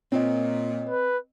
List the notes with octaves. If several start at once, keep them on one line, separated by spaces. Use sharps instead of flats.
A#2 C4 C#5 D#5
B4